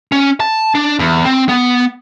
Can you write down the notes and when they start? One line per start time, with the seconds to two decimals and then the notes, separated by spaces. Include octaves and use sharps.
0.12 C#4
0.40 A5
0.75 D4
0.99 E2
1.25 C4
1.49 B3